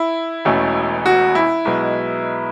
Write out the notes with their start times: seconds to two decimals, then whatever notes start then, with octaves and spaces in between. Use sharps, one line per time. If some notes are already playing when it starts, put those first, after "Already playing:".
Already playing: E4
0.45 E1 E2 B2 A3 C#4
1.06 F#4
1.35 E4
1.65 B1 B2 G#3 B3